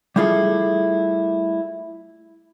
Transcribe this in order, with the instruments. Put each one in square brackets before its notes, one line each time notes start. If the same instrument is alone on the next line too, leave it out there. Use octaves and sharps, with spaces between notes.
[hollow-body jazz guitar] G3 A3 E4 F4 G#4 A4